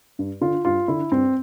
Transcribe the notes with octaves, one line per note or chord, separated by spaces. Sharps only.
G2
D3 F4
G2 F4
D3 E4
G2 C4